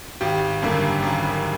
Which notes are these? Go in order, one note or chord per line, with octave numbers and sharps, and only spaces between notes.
G#1 G4
F#2 D3 G3 A#3
G#1